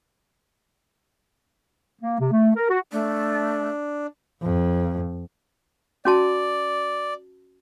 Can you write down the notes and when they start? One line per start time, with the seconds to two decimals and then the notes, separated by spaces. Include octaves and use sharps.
2.02 A#3
2.20 C3
2.32 A3
2.56 A#4
2.70 F#4
2.92 A3 D4
4.42 F2
6.05 C#4 F#4 D5 A5